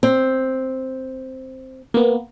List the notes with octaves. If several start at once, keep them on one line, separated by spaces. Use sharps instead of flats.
C4
A#3 B3